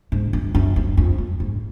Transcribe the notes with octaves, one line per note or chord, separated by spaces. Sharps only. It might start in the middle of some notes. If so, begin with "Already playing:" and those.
G#2
F#2
F#2
F#2
F2
F#2
G#2